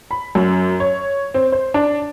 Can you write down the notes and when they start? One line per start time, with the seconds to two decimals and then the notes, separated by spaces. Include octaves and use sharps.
0.11 B5
0.35 F#2
0.80 C#5
1.34 C4
1.52 C5
1.74 D4